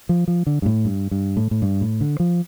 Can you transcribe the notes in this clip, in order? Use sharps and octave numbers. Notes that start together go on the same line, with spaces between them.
F3
F3
D3
G2
A2
G2
G2
A2
A2
G2
A2
D3
F3